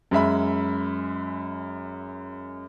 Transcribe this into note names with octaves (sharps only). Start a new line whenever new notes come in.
F#2 G#3 E5 B5